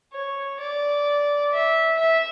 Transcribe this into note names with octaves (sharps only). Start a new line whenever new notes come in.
C#5
D5
E5
E5